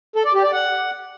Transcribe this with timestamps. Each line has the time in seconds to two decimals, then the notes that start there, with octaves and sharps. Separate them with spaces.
0.16 A4
0.25 D5
0.34 G4
0.43 D5
0.53 F#5